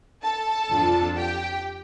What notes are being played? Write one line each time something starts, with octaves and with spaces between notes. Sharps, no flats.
A4 A5
F2 F3 D4 F4
G4 G5